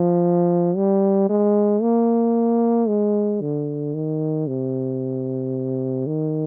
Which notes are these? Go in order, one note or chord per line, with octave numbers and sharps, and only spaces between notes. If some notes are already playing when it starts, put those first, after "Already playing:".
Already playing: F3
G3
G#3
A#3
G#3
D3
D#3
C3
D#3